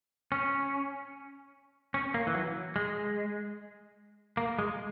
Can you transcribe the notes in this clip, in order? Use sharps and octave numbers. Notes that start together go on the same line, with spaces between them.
C#4
C#4
A#3
E3
F#3
G#3
A#3
G#3